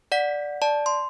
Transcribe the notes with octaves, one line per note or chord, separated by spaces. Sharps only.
D5 F#5 B6
D5 A5
C6